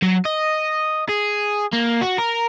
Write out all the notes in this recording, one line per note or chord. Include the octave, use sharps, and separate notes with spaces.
F#3
D#5
G#4
A#3
F#4
A#4